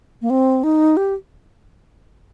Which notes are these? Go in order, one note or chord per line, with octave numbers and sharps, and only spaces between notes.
A#3
C4
D#4
G4